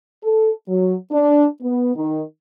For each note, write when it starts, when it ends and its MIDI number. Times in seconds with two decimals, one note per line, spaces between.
0.23 0.51 69
0.68 0.95 54
1.12 1.46 62
1.62 1.94 59
1.95 2.23 51